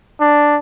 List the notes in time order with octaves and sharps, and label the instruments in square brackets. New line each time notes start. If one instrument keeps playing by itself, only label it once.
[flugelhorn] D4